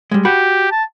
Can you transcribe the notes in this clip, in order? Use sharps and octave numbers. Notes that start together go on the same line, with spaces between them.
G3 G#3
F#4 G4 B5
A5